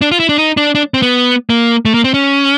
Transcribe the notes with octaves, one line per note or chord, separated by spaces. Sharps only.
D4
F4
E4
D4
D#4
D4
D4
C4
B3
A#3
A3
A#3
C4
C#4